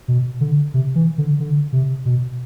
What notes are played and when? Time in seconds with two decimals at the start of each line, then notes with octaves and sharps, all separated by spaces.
0.08 B2
0.41 D3
0.74 C3
0.95 E3
1.18 D3
1.40 D3
1.73 C3
2.05 B2